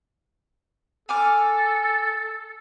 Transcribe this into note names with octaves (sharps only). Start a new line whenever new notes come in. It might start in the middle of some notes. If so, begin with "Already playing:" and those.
A4 G#5 D6 F6